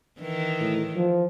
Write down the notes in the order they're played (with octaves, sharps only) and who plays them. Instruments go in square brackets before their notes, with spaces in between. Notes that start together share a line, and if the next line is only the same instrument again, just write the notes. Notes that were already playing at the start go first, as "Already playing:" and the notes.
[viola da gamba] D#3 E3
[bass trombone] A2
F3